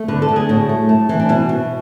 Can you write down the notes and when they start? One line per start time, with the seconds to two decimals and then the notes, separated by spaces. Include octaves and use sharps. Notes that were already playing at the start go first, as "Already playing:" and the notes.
Already playing: A3
0.08 D3 B4
0.22 A4
0.29 D3
0.36 G#4
0.49 A2 F#4
0.69 A3
0.89 A3
1.09 E3
1.20 D4
1.29 B2 E4
1.49 B2